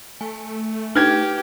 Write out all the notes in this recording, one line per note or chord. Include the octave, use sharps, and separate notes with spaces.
A3 G#5
D4 D#4 G4 B4 F6 G#6